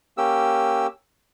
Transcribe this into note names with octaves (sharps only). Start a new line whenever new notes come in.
A#3 C#4 G4 E6